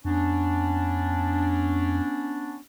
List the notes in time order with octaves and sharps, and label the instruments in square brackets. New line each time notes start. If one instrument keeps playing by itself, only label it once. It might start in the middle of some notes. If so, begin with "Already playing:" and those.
[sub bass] F2 [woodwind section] B3 C#4 D4